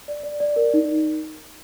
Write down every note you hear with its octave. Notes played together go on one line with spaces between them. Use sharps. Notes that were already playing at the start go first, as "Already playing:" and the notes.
D5
D5
D5
A#4
D#4